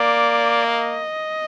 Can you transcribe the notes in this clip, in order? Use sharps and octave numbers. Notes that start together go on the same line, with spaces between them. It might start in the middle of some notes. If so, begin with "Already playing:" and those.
Already playing: A#3 D5
D#5